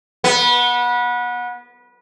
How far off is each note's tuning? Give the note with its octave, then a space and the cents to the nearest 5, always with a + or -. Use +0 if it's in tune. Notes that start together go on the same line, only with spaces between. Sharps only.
B3 -25